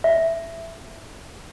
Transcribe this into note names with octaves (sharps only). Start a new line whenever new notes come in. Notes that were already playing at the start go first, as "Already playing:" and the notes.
E5